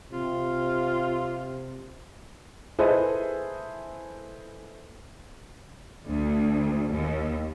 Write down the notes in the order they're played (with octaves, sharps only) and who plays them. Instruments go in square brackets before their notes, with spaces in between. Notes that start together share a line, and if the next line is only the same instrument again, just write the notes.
[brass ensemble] C3 [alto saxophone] F4
[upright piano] E4 G#4 A4 B4 C5 D#5
[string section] D2
D#2